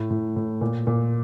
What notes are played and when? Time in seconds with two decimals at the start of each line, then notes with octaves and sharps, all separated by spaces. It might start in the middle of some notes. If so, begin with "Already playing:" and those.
Already playing: A2
0.10 A2
0.36 A2
0.61 A#2
0.87 A#2